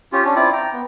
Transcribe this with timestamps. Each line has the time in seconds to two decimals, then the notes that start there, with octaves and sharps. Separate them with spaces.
0.13 C#4 F4 G4
0.24 C#4 D4
0.36 C4 E4 F4 D5
0.53 G5 A#5
0.73 B3